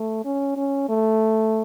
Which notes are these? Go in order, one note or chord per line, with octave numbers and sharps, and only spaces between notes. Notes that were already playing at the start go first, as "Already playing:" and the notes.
Already playing: A3
C#4
C#4
A3